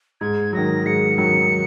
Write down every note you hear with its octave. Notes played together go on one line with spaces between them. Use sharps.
G#2 G#6
D#3 F#3 A#6
G#2 C#7
D#3 F#3 C#7